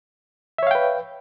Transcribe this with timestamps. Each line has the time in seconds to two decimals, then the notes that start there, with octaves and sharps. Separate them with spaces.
0.58 E5
0.63 C#5
0.67 F5
0.71 G5
0.75 B4